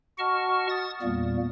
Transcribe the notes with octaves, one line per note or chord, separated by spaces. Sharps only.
F#4 D#5 F#5 A5 C#6 F6
D#6 A6
E2 A#2 G3 A#3